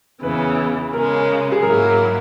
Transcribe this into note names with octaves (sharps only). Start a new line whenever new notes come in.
E2 C#3 E3 B4
C#3 G#3 C#4 A#4
G#4
G#2 F#3 A#3 E4 A#4